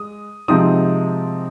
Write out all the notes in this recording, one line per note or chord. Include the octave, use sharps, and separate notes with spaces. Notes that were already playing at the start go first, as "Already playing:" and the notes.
Already playing: G#3 D#6
C3 F3 G#3 C4 D#4 D#6